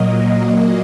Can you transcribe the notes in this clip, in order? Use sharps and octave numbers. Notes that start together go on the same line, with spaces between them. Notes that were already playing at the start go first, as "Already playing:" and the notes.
Already playing: A#2 F#3 A#3 D#5